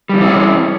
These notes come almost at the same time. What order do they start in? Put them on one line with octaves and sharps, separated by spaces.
G3 D#3 E3 C4 C#4